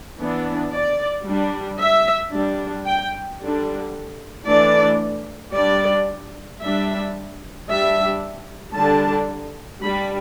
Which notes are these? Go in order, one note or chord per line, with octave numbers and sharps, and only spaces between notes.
E3 B3 D4
D5
G3 D4
E5
G3 D4
G5
D3 G3 D4
E3 A3 D4 D5
G3 D4 D5
G3 D4 E5
G3 D4 E5
D3 G3 D4 A5
G3 D4 B5